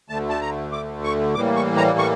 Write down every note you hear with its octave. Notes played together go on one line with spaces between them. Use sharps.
D2 D3 A3 A5
A5
A#5
D6
C#6
A2 E3 G3 A#3 D6
C#6
A#5
C#6